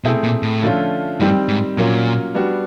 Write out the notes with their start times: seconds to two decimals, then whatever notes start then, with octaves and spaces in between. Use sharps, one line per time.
0.04 B2 A3 C4 E4 G#4
0.23 A#2
0.43 A2
0.62 D3 F3 A3 C#4 F4
1.20 G2 D#3 G3 C4
1.48 G#2
1.77 A#2 F#3 A#3 C#4 F4
2.35 G3 B3 D4 F#4